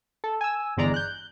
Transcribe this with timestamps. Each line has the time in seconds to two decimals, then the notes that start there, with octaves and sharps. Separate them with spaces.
0.24 A4
0.41 G#5 E6
0.77 G1 E2 G#3 D5 A#5
0.94 F#6 G6